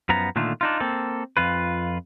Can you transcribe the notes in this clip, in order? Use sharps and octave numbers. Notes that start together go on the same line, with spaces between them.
F#2 F3 B3 A#5
A#2 D3 D#3 A3 F4
D4 D#4 F4
A#3 C4 A4
F2 F4 B4